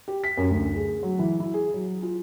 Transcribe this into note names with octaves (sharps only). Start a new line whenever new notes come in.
G4
B6
F#2
D2
G#4
F#3
E3
E4
G#4
F#3
F4